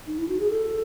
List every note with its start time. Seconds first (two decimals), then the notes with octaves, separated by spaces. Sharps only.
0.07 D#4
0.18 E4
0.29 F#4
0.40 G#4
0.50 A4